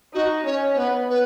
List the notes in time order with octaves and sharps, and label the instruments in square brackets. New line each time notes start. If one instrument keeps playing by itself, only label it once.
[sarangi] D#4 [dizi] F#4
[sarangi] C#4 [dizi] C#5
[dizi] C#5
[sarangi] B3 [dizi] B4
[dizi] B4